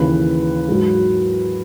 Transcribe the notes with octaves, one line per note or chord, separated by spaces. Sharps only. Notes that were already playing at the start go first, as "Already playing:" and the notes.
Already playing: D#2 C#3 E3 B4
G#2 F#3